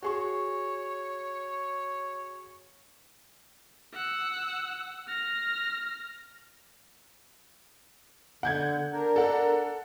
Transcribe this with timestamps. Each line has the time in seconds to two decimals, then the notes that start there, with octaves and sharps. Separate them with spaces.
0.02 F#4 G#4 C#5 C#6
3.94 F#5 E6
5.08 F6 A#6
8.43 D3 F#5 G6 G#6
8.93 D4 A#4
9.16 A4 F#5